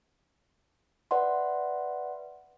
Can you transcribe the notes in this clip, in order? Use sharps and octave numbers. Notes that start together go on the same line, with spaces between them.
B4 D5 E5 F#5 C6